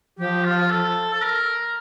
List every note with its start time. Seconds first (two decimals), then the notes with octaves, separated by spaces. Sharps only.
0.18 F3 G4
0.44 F4
0.70 A4
1.13 A4
1.22 A#4